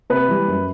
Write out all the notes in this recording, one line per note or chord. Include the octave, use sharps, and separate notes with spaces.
C3 B4
E3 G3
F#2